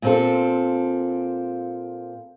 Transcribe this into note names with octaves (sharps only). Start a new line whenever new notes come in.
A#2 C4 A4